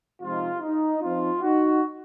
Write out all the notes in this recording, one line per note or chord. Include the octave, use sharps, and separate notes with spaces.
C3 F3 G#3 D#4 F4
D#4
F3 C4 D#4 F4
D#4 F#4